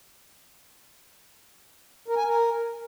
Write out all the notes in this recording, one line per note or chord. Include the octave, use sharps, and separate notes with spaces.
A#4
G#5
A#4